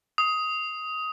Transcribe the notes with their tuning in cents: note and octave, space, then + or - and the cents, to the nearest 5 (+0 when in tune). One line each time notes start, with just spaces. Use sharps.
D#6 +15